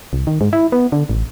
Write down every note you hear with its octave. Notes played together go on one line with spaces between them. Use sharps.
C2
D#3
G#2
E4
B3
D3
A1